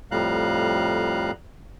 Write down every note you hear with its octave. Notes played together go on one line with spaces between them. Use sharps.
F2 A2 G3 F5 A#5 F#6